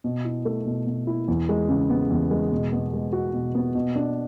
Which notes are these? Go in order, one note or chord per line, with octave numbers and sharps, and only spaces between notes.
B2
E4
A3
B2
B2
E4
E2
G#3
C#3
B3
E2
G#3
B2
B3
G#3
F#4
B2
B3
B2
D4